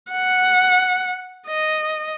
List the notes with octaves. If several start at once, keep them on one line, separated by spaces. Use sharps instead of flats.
F#5
D#5